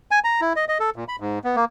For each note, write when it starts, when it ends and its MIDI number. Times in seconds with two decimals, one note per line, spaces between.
0.11 0.19 80
0.24 0.41 82
0.41 0.53 64
0.56 0.65 75
0.69 0.78 75
0.80 0.90 69
0.96 1.04 46
1.08 1.16 83
1.20 1.39 44
1.44 1.56 59
1.56 1.65 58